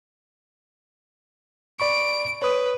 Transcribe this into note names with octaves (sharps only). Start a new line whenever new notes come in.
D5 B5 C#6 D7
B4 C#5 D#6